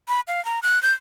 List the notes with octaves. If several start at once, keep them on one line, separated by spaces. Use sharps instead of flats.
B5
F5
A#5
F#6
G6